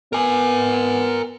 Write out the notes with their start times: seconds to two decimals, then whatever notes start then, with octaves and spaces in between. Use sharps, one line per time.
0.13 B3 A#4 G#5